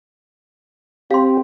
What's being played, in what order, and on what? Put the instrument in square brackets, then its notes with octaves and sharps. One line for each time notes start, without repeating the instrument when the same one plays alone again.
[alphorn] C4 [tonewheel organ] G4 [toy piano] F5 C6